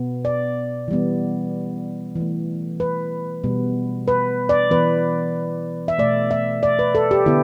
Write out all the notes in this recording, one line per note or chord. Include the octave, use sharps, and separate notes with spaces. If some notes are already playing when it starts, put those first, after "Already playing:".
Already playing: B2 B3
D5
E3 G3 B3
E3 A3
B4
B2 G3 B3
B4
D5
E3 B3 B4
E5
B2 A3 D5
E5
D5
B4
A4
G4
D3 B3 E4